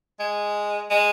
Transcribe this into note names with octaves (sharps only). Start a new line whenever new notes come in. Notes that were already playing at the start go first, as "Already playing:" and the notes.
G#3
G#3